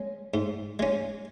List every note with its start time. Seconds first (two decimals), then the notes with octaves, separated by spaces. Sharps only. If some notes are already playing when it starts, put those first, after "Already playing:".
Already playing: G#3 C#4
0.34 G#2
0.79 G#3 C#4